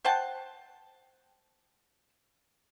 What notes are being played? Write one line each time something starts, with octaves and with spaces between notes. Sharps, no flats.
C5 F#5 G5 A5